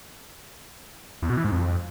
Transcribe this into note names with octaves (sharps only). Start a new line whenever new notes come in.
E2
B2
E3
G#2
F2